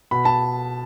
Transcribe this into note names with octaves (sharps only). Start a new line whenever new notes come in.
B2 B5
A5